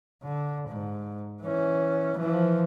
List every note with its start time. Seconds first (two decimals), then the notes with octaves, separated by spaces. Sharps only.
0.23 D3
0.68 G#2
1.43 E3 C#4
2.17 E3 F3